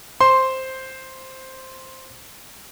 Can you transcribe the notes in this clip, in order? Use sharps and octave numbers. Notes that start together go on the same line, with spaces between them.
C5 C6